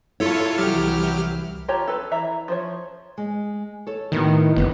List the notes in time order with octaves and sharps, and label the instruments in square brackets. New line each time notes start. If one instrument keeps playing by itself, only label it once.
[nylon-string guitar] E4 [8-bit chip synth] F4 A4 C#5
[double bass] C2 E3 [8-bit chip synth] F#3 G4 F6
[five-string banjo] F4 G4 C#5 A5 A#5
A4 B4
E3 E5 A#5
F3 C5 C#5
[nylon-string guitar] G#3
A4 C#5
[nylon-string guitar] A2 B3 F#4 [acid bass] D#3
[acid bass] G1 [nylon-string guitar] B3 D#4 D#5